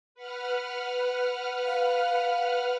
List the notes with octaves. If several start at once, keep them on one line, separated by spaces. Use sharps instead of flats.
B4 F#5 F6
F5